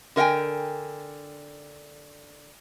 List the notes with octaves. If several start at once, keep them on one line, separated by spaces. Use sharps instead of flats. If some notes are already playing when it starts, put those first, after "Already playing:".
D3 A#4 E5 G5 G#5